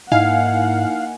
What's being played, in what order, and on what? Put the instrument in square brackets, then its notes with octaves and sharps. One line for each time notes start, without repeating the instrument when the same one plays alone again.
[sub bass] G#2 [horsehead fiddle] A#3 F#5 [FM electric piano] D#4 E4 G#5 [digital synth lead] F5